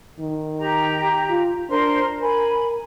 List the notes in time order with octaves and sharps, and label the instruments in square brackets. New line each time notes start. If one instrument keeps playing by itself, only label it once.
[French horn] D#3
[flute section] G4 A#5
[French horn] F4
[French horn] D4 [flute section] A#4 C5 C6
[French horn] A#4 [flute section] G#5 B5